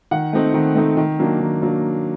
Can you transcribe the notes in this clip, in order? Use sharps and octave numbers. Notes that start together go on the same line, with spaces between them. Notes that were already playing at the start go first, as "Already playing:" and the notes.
D#3 F#5
A3 C4 D#4
D#3
A3 C4 D#4
D#3
F#3 A#3 D4
D#3
F#3 A#3 D4